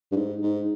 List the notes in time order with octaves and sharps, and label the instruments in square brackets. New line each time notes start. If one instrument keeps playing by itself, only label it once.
[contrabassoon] G2
G#2
G#2